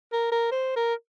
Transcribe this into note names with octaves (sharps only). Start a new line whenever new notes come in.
A#4
A#4
C5
A#4